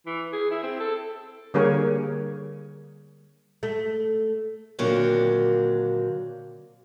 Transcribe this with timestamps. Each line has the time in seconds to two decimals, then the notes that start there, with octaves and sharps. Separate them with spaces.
0.06 E3
0.33 G#4
0.51 E4
0.63 C4
0.80 A4
1.54 D3 G3 A#3 G#4 A#4 C#5
3.63 A3
4.79 A#2 D3 D#3 F#3 A#3 C4